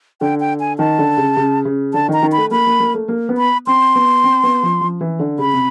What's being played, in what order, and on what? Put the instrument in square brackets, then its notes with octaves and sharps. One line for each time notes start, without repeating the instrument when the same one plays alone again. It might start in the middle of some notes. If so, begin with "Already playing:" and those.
[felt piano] D3 [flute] G5
[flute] G5
G#5
[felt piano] D#3 [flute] A5
[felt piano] D3
C#3
C#3
C#3
[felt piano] D3 [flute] A5
[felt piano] D#3 [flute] A#5
[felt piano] D#3
[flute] B5
[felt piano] A3
[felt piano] A#3 [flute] B5
[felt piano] A#3
A#3
A3
A#3
B3
[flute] B5
[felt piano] C4 [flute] C6
[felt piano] B3
C4
B3
F3
F3
E3
D3
[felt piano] C#3 [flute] B5
[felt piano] C3